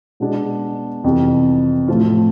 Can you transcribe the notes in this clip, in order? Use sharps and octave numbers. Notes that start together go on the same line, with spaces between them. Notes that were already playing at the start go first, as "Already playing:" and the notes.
B2 G#3 B3 D4 G#4
F2 C3 E3
A2 F3 A3 C4 F4